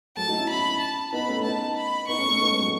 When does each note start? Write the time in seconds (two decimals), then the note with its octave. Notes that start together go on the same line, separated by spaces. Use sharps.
0.17 F#3 A3 A5
0.27 D#4 F#4
0.38 C#4 E4
0.49 B5
0.80 A5
1.13 B3 D#4 B5
1.28 A3 C#4
1.44 B3 D#4 A5
1.76 B5
2.08 B3 D#4 C#6
2.19 A3 C#4
2.29 A3 C#4
2.40 B3 D#4
2.50 G#3 B3
2.61 F#3 A3